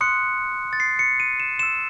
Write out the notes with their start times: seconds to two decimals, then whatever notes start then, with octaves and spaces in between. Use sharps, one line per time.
0.01 C6 D#6 F#6 C#7
0.73 A6
0.80 C7
0.99 C#7
1.20 D#7
1.40 E7
1.59 C6 E6 E7